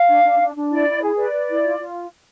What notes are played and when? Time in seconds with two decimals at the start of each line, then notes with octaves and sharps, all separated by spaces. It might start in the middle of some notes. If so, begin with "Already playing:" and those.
Already playing: F5
0.08 D4
0.24 D4
0.40 D4
0.55 D4
0.70 E4 D5
0.86 E4
1.02 G#4
1.17 B4 D5
1.33 B4
1.49 E4
1.64 F4
1.79 F4